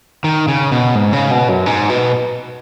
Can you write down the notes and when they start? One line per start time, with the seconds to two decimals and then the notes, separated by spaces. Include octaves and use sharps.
0.24 D#3
0.48 C#3
0.72 B2
0.95 G#2
1.13 C#3
1.31 B2
1.49 F#2
1.66 G#2
1.90 B2